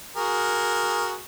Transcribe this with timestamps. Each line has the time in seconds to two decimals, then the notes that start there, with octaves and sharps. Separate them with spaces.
0.16 F#4 G#4 A#4